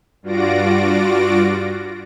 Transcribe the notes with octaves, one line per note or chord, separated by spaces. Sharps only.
G2 F4 F#4 D5 A#6 D7